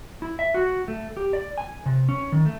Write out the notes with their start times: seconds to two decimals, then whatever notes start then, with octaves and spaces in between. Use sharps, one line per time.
0.22 E4
0.39 E5
0.54 F#4
0.88 A3
1.17 G4
1.33 D5
1.58 G#5
1.86 C3
2.09 C#4
2.32 D#3
2.45 A3